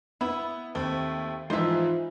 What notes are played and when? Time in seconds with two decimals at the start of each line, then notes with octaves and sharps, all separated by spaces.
0.21 B3 E4
0.75 D#2 A3 C4
1.50 G#2 E3 F3 D#4 F4 C5 E5